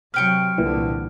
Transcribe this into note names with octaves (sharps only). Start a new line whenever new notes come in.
C3 F#3 B4 G5 C#6 F6 D7
C2 A#2 D3 E3